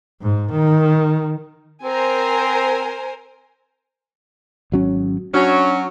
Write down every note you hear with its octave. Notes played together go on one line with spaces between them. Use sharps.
G#2
D#3
C4 A#4 C5 G#5
G#1 F#3 C#4
F#3 C#4 D4